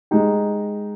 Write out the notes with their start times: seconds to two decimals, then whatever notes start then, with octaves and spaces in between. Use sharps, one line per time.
0.11 G#3 D#4 G4